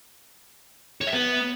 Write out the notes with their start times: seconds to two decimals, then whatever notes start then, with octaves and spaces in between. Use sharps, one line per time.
1.01 C#5
1.07 E5
1.13 B3